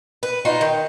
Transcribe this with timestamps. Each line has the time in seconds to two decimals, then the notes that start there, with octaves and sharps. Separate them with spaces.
0.23 B4
0.45 D#4 F4 F#4
0.61 D#3